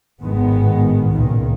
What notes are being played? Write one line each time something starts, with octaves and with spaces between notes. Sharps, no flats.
G#1 A2 D#3 G#3 B3
C#2 A#2 D#3